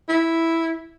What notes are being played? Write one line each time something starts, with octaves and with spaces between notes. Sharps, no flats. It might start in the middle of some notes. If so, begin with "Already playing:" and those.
E4